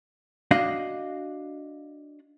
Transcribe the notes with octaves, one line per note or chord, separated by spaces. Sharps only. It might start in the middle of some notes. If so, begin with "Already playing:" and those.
D4 F#4 D#5 F5